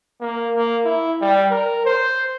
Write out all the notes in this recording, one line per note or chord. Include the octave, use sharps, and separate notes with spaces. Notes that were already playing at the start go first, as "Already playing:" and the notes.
A#3
A#3
E4
G3
A#4
C5